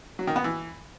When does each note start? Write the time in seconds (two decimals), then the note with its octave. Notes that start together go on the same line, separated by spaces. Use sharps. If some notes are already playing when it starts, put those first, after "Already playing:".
0.19 F#3
0.27 D#3
0.36 B3
0.44 E3